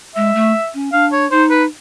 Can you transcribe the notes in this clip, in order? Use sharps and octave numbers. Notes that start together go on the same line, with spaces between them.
G#3 E5
A3
C#4
D4 F5
C#5
D#4 C5
B4